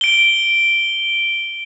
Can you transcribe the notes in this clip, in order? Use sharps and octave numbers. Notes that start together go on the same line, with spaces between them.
D7 G7